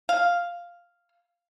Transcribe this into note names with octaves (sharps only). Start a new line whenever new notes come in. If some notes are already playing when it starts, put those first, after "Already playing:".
F5